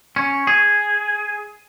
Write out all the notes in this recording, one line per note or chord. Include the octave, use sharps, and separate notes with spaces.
C#4
G#4